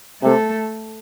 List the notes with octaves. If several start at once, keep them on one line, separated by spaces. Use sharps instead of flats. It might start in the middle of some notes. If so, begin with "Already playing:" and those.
C3 A3 A4